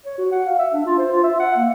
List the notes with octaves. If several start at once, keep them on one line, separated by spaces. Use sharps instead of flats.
C#5
F#4
F#5
F5
E5
D4
F4
C5
F4
E5
F#5
A#3